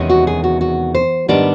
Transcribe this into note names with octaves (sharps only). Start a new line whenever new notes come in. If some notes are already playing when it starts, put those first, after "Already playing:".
Already playing: E2 C3 D#3 G#3 C#4
F#4
G#4
F#4
F#4
C5
G#2 D#3 G3 B3 D4 D5